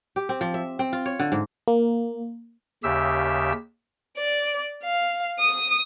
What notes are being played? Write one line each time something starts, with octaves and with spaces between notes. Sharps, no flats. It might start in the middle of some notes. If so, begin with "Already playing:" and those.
G4
C4
F3
E5
C4
F4
C#5
D3
G#2
A#3
D#2 C#3 G4 E5 E6
D5
F5
D#6